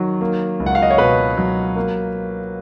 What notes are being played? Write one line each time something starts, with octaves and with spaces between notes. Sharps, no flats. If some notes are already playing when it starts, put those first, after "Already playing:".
Already playing: D#3 F#3
A#3
C#2
F#5
F5
D#5
C#5
B2 B4
F#3
A#3